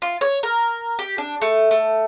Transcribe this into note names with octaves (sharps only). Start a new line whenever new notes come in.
F4
C#5
A#4
G4
D4
A3
A3